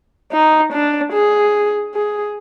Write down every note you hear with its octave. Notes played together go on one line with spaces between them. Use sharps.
D#4
D4
G#4
G#4